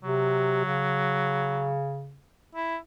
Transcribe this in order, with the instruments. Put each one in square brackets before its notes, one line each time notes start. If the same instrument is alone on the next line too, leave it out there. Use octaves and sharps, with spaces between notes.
[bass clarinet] C3 [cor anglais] F#3
[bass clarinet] C#3
[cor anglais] E4